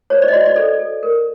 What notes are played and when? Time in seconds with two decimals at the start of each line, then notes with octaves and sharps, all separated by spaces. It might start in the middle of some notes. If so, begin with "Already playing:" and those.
0.10 C5 C#5
0.22 D5
0.28 D#5
0.33 F#4 D5
0.46 D5
0.56 A4 D5
0.79 A4
1.03 A#4